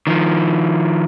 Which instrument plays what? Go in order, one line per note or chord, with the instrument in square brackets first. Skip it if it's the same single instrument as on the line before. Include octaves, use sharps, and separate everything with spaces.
[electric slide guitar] D#3 F3